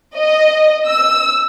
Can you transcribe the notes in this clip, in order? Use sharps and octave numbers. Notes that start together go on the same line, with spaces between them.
D#5
E6